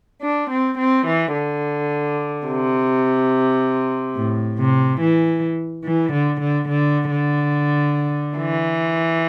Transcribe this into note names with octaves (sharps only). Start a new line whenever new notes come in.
D4
C4
C4
E3
D3
C3
A2
C3
E3
E3
D3
D3
D3
D3
E3